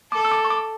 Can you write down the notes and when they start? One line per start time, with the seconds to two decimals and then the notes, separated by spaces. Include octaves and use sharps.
0.12 A4 D6
0.25 E6
0.31 D6
0.45 C#6
0.50 D6